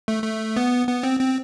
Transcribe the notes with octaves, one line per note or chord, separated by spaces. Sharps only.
A3
A3
B3
B3
C4
C4